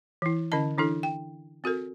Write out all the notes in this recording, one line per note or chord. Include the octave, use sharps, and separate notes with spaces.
E3 E4
D3 C#4 E4 D#5 A5
E3 D4 E4 A4
G5
C4 F#4 A4 A#4